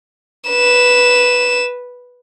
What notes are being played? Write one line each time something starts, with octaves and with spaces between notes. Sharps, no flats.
B4 E7